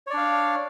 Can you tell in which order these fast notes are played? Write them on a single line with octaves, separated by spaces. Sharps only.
C#5 D5 D4 F5